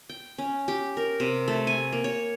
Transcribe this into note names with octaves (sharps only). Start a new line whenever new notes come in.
G5
C#4
G4
A#4
C3
A3
G#5
A#3
C#5